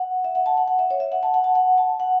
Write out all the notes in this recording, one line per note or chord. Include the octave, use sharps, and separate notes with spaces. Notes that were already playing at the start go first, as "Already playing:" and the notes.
Already playing: F#5
E5
F#5
A5
F#5
F#5
E5
C#5
E5
F#5
A5
F#5
A5
F#5
A5
F#5